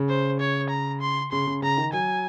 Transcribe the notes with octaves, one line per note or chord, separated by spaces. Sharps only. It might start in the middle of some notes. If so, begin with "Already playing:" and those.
Already playing: C#3
C5
C#5
A#5
C6
C#3 C6
C#3
C#3 A#5
D#3
F#3 G#5